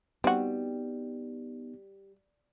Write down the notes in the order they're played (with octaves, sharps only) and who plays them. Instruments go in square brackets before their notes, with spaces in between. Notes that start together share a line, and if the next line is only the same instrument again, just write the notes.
[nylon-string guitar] G3 [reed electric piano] B3 D#4 [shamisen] C4 F#4